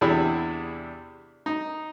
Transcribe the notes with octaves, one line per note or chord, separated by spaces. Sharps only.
E2 C3 D4 E4 G#4 B5
D#4